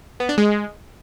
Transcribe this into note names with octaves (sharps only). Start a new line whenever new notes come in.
B3
D4
G#3